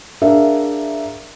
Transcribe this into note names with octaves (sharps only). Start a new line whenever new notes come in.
D4 G#4 A#4 E5 F5